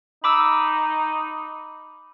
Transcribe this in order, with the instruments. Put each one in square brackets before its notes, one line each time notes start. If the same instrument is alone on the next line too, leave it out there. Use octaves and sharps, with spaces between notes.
[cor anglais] D#4 [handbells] B5 D6 E6